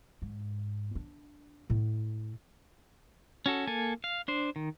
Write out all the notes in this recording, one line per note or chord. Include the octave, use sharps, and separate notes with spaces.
G#2
D4
A2
C#4 F#4 A4
A#3 A4 G#5
F5
D4 C5
D#3